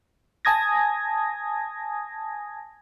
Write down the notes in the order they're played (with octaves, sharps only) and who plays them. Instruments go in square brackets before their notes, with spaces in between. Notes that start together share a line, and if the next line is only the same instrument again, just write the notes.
[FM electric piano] G#5 A5 D#6 G#6 A#6